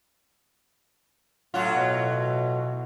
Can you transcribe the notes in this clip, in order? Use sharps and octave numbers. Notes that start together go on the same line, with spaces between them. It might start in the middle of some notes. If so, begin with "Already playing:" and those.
A2 F#3 F4
B2